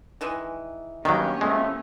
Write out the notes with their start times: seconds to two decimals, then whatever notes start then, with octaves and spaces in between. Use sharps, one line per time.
0.21 D#3 E3 G#3
1.05 G2 D#3 F#3 A#3 B3 C#4 G4
1.41 A2 F3 G#3 A3